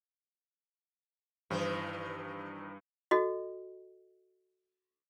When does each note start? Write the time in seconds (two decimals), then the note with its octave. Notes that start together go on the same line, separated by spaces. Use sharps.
1.50 G2 D#3 E3 C5
3.11 F#4 A4 D#5